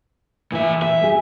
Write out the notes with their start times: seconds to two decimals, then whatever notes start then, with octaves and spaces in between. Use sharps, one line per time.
0.52 A#2 E3 E5
0.82 E5
1.01 A3 G#4